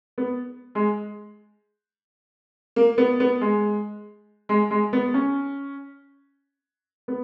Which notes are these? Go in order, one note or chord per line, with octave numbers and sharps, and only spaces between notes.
B3
G#3
A#3
B3
B3
G#3
G#3
G#3
B3
C#4
B3